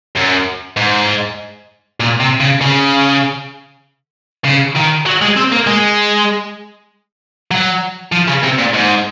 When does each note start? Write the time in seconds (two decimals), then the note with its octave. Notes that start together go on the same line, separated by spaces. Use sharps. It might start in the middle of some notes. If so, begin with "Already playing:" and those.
0.15 F#2
0.77 G#2
2.00 A#2
2.20 C3
2.40 C#3
2.61 C#3
4.45 C#3
4.76 D#3
5.06 F#3
5.22 G#3
5.37 C4
5.52 A#3
5.67 G#3
7.51 F#3
8.12 F3
8.28 C#3
8.43 C3
8.59 A#2
8.74 G#2